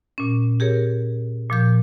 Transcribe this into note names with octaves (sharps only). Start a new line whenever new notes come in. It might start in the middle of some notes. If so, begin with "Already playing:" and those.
A#2 C#4
G4 G#4 A#4 C#5
A#2 F3 G6